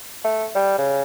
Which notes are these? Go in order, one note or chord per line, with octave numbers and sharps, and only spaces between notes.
A3
G3
C#3